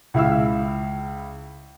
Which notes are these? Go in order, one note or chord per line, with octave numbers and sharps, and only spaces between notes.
C#2 E4 F5 E6